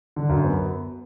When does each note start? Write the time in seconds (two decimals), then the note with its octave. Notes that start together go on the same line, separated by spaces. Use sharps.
0.16 D3
0.29 F#2
0.44 B3